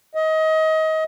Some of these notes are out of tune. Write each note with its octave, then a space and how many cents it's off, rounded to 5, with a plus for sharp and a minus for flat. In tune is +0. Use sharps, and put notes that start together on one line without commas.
D#5 +25